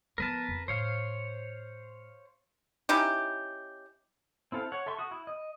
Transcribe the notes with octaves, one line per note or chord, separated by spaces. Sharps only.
F3 B3 A#4 B4 A5
F2
A2 C5 C#5 F5
C#4 D#4 E4 G4
C4 E4 A4 F5
C#5 F#5
A4 E5 C6 C#6
F#4 D#6
E4
D#5